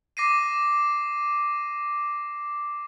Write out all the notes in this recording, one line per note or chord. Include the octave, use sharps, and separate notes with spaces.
D6 A#6 C7 D#7